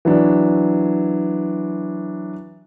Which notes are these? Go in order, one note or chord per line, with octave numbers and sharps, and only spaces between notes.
E3 F#3 D4